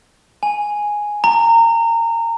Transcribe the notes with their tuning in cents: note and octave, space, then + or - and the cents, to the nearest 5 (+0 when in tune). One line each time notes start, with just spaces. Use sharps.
G#5 +0
A#5 -25